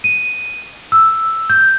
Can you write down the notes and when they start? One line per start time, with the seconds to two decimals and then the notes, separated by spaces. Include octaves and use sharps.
0.04 D#7
0.92 E6
1.50 G6